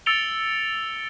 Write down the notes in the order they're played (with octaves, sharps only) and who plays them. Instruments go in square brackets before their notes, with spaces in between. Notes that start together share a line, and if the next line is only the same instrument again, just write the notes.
[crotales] E6 A6 C#7 D7 F7 G7